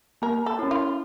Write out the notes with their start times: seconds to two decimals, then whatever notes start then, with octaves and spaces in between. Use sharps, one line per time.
0.22 A#3 A#4
0.46 A4
0.59 C#4 E4
0.71 F4